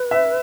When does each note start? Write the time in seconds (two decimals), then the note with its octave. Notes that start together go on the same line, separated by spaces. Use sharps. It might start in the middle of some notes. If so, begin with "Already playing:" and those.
Already playing: B4
0.11 E5